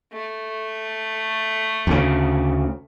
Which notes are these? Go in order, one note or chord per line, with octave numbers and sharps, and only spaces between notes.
A3
D2 C#3